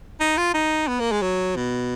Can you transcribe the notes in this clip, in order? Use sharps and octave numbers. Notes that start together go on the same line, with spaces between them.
D#4
F4
D#4
B3
A#3
G#3
F#3
B2